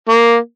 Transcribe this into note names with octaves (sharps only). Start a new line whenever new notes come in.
A#3